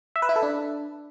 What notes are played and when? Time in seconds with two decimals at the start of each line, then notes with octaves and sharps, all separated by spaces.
0.16 E5
0.22 B4
0.29 E4
0.36 A4
0.43 D4